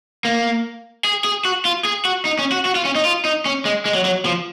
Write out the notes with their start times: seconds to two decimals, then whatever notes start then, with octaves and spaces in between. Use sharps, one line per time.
0.25 A#3
1.05 G#4
1.24 G#4
1.45 F#4
1.65 F4
1.85 G#4
2.05 F#4
2.25 D#4
2.39 C#4
2.52 F#4
2.65 F#4
2.76 F4
2.85 C#4
2.95 D#4
3.05 F4
3.25 D#4
3.46 C#4
3.65 G#3
3.86 G#3
3.95 F#3
4.05 F#3
4.26 F3